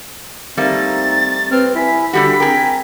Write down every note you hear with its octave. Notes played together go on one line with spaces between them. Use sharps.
G3 A3 A#3 C4 D#4 A6
C4 B4 F6
E4 G#5 B6
D3 G3 F#4 G4 A4 B6
C4 G#4 A#4 G5